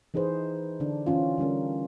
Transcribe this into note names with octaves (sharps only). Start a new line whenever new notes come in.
E3 D#4 G#4 B4 C5
D3 D4
E3 C#4 F4
D3 G3 C#4 A#4